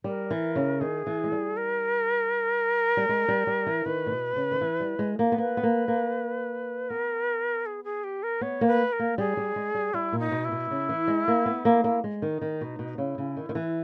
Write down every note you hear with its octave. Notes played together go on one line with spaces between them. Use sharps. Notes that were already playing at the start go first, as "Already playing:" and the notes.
G3 A#4
E3
C#3
D#3 G#4
E3
G#3
G3
A#4
G3
G#3
G3
G3
E3
D#3 B4
A#2
B2
C#3
D#3
E3
G3
G#3
A#3
B3
A#3 B4
B3
A#3
A#3
B3 A#4
G#4
G#4
G4
A#4
B3 C#5
A#3
B4
A#4
A#3
G3 G#4
G3
G#3
G3
G3 E4
A#2
D#4
B2
E4
B2
C#3
E3
G#3
A#3
B3
A#3
A#3
G#3
D#3 D#4
D#3
B2
B2
C#3 E4
C#3
D#3
D#3
E3